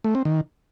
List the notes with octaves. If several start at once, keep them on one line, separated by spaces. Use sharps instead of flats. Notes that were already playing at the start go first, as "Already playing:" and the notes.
A3
C4
D#3